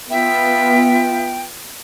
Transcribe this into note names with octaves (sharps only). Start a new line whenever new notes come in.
B3 F4 E5 G5